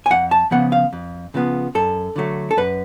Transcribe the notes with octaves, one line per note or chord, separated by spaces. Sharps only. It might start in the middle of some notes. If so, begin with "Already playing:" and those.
G#5
F2 F#5
A5
C#3 F3 B3 F#5
F5
F2
C#3 F3 B3
F#2 A4
D3 F#3 A3
A4
F#2 B4